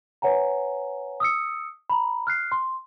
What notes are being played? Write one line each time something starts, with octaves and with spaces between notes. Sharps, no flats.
B4 C#5 F#5 G#5 A#5
D#6 E6 C#7
A#5 B5
F6 F#6 C7
C6